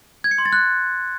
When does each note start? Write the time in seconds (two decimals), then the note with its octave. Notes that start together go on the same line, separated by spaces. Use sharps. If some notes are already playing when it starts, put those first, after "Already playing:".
0.24 G#6
0.31 C#7
0.38 C6
0.45 A6
0.53 F#6